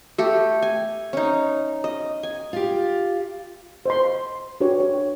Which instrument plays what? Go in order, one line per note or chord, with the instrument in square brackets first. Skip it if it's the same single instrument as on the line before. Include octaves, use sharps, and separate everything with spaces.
[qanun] A3 G4 A4
G#5
C#4 D#4
D#5
G#5
[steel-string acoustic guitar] F4 G4
[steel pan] C5 D#5 C6
D4 F#4 G4 B4 C#5
C#5